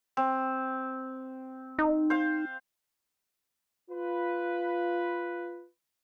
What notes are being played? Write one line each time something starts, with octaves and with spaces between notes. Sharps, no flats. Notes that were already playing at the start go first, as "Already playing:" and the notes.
C4
D#4
C5 F5
F4 B4